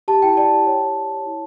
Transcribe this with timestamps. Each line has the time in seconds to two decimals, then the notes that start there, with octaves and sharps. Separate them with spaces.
0.08 G4 A5
0.22 E4 G5
0.37 D5 A5
0.52 G4
0.67 C#5
0.81 C#5
0.96 C#5
1.12 C#5
1.26 E4